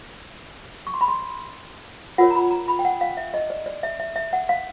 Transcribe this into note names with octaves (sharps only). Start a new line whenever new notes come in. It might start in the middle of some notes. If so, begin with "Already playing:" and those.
C#6
C6
B5
C6
F4 A#4 C#5 F#5
A#5
B5
A#5
B5
G5
F#5
F5
E5
D#5
D5
D5
E5
E5
E5
F#5
F5